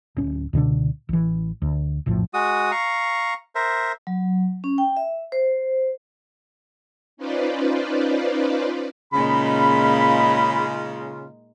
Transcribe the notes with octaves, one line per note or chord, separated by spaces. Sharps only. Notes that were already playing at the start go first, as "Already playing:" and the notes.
D1 C#4
C#2 B2 D3 D4
A1 E3
D2
F1 A#1 A2 F3
G#3 F#4 D#6
F5 A#5 C#6
A#4 C5 E5
F#3
C#4
G5
E5
C5
C#4 D#4 F4 B4 C5 D5
A#2 C#3 G#3 D#4 F4 B5